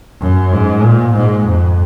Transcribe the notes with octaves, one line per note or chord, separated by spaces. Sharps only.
F#2
G#2
A#2
G#2
F2